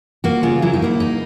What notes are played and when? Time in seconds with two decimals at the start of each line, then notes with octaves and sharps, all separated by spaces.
0.24 A#3 F#4
0.43 C#3 F4
0.62 F#3 E4
0.73 D#4
0.82 A#3 E4
1.00 D#4